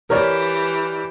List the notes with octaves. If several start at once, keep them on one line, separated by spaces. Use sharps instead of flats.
E3 G4 A#4 C#5 D5